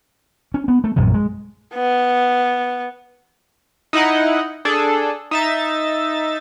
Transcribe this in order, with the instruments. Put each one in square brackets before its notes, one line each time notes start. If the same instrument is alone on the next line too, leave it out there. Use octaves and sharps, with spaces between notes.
[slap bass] C#4
B3
A3
A#1 F#2 A2 C3
G#3
[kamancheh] B3
[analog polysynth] D#4 E4 D#5 F#5
D4 G#4 A4
D#4 E5 A6